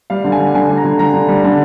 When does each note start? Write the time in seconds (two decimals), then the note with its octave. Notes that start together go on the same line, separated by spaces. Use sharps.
0.10 G3 F5
0.24 D3
0.32 G#5
0.40 G3
0.54 D3 G#5
0.70 G3
0.77 A#5
0.85 D3
0.99 G3 A#5
1.14 D3
1.28 G3
1.44 D3